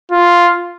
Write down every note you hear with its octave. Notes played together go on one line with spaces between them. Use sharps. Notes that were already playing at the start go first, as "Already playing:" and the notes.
F4